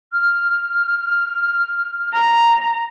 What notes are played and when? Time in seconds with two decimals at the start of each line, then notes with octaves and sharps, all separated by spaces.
0.12 F6
2.13 A#5